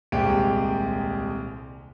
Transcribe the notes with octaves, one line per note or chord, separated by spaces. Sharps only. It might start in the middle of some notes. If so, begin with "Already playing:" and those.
D#1 C2 G#3 C4 G4 D7